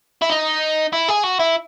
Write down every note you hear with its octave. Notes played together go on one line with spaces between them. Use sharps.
E4
D#4
E4
G#4
F#4
E4